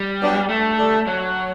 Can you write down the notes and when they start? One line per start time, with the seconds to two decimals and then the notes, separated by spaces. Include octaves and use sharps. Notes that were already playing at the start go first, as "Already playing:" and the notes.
Already playing: G3
0.21 F#3 B3 D4 G4
0.49 A3
0.78 D3 G3 D4 A4
1.07 F#3